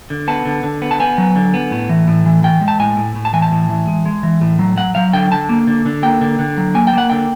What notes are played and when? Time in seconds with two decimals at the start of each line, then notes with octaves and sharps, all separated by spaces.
0.10 D3
0.28 B3 A5
0.46 D3
0.63 D3
0.82 B3
0.91 A5
1.00 B3 G#5
1.18 F#3
1.36 D3
1.54 B3
1.71 A2
1.89 E3
2.08 A2
2.26 E3
2.43 E3 G5
2.61 G#3
2.68 A5
2.80 A2 G#5
2.97 A2
3.15 A2
3.25 A5
3.33 E3 G#5
3.42 A5
3.52 A2
3.69 E3
3.88 G#3
4.06 G#3
4.23 E3
4.42 A2
4.59 F#3
4.77 F#3 F#5
4.95 F#3 F5
5.13 D3 G5
5.31 D3 A5
5.49 A#3
5.67 D3
5.85 D3
6.03 A#3 G5
6.21 D3
6.39 D3
6.57 F#3
6.75 A#3 G#5
6.87 G5
6.93 A#3 F#5
7.10 D3 G5